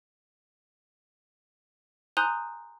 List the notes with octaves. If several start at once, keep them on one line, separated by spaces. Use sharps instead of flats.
G#5 A#5 C6 D#6 F#6 G6